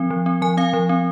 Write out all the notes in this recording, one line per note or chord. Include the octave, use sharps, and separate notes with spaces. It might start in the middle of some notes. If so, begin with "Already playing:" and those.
Already playing: F3 C4
F3
C4
F3 G#5
C4 F5
F3
C4